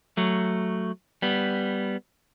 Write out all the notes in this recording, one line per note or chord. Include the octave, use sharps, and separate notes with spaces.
F#3 A3
G3 B3